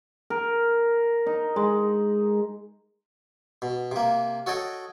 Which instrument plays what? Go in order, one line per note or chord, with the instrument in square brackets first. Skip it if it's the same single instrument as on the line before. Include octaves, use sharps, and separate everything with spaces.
[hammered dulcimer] A#4
D#4
G#3
[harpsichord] B2
C3 A#3
F#4 A4 C#5 D#5 G5